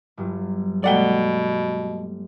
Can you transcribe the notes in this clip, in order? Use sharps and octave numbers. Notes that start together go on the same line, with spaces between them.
G1 G2 F#3
B2 G#3 A#3 A4 D5 F#5 G5